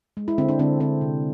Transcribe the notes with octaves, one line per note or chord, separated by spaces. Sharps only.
G#3
E4
D3 C4
D4
D3 C4
D3 C4
C3